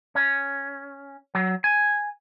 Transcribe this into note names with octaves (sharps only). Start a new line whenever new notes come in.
C#4
F#3
G#5